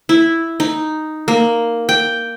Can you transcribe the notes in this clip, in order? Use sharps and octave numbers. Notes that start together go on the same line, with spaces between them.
E4
D#4
A#3
G5